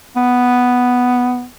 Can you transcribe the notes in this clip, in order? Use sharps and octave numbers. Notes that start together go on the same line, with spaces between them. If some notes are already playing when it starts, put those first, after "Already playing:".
B3